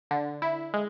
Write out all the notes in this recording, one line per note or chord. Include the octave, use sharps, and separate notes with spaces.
D3
E4
G#3